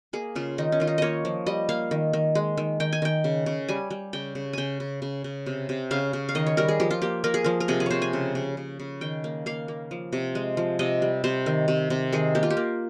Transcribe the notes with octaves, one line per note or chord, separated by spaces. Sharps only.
A#3 G#4
C#3 F4
D#3 D#4
C#4
D#3 F4
D#4
A#3 C#5 D#5
F3
G3 D#5
A#3 F5
D#3
D#3
G#3
D#3
D#3 G5
G#5
D#3 G5
C#3
C#3
G3 G#5
G3
C#3 G5
C#3
C#3 G5 G#5
C#3
C#3
C#3
C3
C3
C#3 F5
C#3
F5
D#3 D#5
C#5
G3 A#4
G#4
F3 G4
F4
A#3 G4
A#3 A#4
G#4
F3 A#4
A#4
C3 G#4
G#4
C3 C5 C#5
G#5
C#3
C#3
C#3
C#3
D#3 G5
A#3
A#3 F5
A#3
F3
C3
G#3
F3
C3 D#5
G3
C3 C5
D#3
C3
C3
D#3 G#4
A#3 G4
F4
G4
A#3